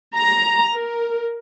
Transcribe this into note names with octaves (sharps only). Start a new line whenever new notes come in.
A#5
A#4